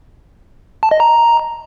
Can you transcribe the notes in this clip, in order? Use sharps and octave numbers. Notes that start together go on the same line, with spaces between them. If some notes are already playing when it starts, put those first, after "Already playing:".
A5
D#5
A#5